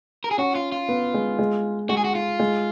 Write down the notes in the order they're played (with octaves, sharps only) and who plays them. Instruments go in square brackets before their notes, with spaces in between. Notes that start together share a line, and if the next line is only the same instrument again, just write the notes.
[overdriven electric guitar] A#4
G#4
[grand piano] C#4 [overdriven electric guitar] F#4
[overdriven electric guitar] F4
F4
[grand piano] B3
G#3
G#3
[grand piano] G#3 [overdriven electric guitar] F#4
[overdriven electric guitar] G#4
F#4
F4
[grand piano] G#3